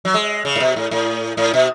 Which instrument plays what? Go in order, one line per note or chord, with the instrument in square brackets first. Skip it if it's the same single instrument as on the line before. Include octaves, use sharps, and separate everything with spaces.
[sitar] F#3
G#3
C#3
A2
B2
A2
A2
A2
B2